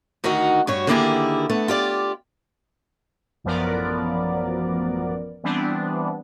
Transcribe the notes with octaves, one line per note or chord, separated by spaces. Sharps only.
D2 D#3 D#4 F#4 F#5
G2 F#4 C#5
D3 D#3 A#3 E4 G4 G#4
A3 B3
F4 G4 D5
A1 F#2 F3 B3 A#4 D5
E3 G3 B3 C4 D4